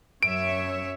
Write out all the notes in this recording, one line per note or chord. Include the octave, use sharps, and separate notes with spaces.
F#2 C#5 E5 D7